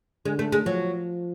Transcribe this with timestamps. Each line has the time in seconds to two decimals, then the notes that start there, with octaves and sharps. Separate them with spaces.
0.25 D3 G#3
0.39 A3
0.52 G#3
0.65 F3 F#3